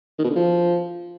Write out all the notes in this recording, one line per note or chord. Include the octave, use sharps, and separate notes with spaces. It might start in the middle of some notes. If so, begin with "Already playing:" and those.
D#3
B2
D3
F3